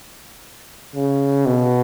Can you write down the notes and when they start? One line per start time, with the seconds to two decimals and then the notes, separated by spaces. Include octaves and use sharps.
0.95 C#3
1.46 B2